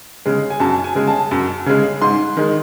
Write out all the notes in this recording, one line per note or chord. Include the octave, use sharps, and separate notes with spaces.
C#3 G#3
G#5
F#2 A5
G#5
C#3 G#3
A5
F#2
C#3 G#3
G#2 C6
D#3 G#3